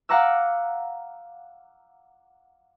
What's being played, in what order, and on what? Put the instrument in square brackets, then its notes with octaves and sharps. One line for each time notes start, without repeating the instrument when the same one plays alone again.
[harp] F5 F#5 A#5 D6 E6